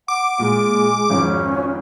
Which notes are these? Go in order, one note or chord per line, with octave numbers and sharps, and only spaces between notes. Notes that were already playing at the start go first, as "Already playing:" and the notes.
F#5 D6
A#2 G#3
G#1 F2 G#2 C#4